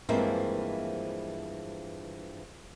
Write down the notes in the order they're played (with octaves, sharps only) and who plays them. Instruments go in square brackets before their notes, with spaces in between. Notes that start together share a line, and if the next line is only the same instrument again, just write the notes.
[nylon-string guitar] G2 E3 F3 G#3 A#3 C4